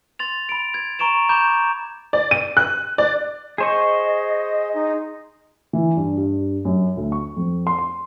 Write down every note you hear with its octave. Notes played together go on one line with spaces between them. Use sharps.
C6 A6 F7
B5 D7
G#6
A#5 C#6 D7 E7 F7
A#5 B5 C#6 D6 G6 E7
D5
D#7
F#6
D5
G#4 C5 D#5 C#6
D#4
E3
G2
G2
F#2
D2
C#6
F2
C6
C6